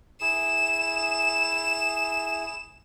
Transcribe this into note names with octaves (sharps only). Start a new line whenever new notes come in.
E4 G#4 E7